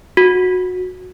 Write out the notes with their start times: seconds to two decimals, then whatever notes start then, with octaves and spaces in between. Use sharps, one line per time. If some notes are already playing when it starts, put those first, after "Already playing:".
0.17 F#4